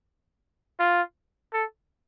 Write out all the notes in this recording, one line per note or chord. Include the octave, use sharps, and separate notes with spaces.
F4
A4